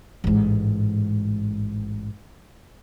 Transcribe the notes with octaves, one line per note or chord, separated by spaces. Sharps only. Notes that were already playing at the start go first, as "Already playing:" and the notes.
A1 G#2